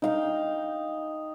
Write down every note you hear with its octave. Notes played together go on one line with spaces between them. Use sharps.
D#4 F5 G5